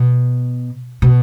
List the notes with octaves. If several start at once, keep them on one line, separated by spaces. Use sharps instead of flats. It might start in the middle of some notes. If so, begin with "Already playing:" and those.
Already playing: B2
B2